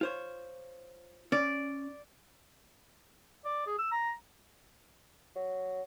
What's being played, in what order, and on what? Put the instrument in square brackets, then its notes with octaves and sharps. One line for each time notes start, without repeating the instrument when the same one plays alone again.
[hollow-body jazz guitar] F4 C5 C#5
[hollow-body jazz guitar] C#4 [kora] D5
[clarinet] D5
G#4
E6
A#5
[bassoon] F#3